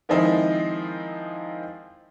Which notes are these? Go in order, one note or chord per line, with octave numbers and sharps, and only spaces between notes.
D#3 F3 G#3 C4 D#4 E4